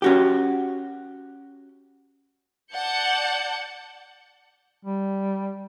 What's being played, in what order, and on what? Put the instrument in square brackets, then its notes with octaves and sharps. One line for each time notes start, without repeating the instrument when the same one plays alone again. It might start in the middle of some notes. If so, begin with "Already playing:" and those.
[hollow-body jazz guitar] C#4 F#4 G4
[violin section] D5 F#5 A5 G6 C#7
[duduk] G3